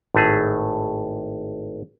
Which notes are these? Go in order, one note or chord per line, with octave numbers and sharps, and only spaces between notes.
G#1 A2 A3 G#4